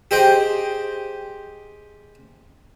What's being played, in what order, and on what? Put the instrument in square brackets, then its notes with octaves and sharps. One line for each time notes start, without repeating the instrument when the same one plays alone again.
[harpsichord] G4 G#4 C5 D#5 G5